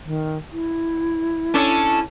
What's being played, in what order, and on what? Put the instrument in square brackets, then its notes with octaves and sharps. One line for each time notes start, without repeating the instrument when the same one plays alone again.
[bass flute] D#3
E4
[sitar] C#4 D4 A4